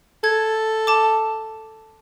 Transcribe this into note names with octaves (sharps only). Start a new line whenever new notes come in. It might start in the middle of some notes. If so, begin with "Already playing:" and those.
A4 G#6
A5 D6